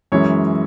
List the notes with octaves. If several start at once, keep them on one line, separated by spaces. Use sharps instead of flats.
F#2 E3 G#3 C#4 C#5